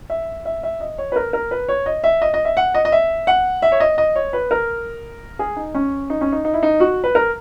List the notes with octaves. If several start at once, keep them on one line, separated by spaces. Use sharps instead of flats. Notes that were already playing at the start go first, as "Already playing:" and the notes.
E5
E5
E5
D#5
C#5
B4
A#4
A#4
B4
C#5
D#5
E5
D#5
D#5
E5
F#5
D#5
D#5
E5
F#5
E5
C#5
D#5
D#5
C#5
B4
A#4
G#4
D#4
C#4
D#4
C#4
D#4
D#4
E4
D#4
F#4
B4
A#4